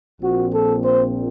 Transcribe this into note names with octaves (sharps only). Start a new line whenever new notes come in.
A#1 A#2 F3 C4 F#4
A4
C5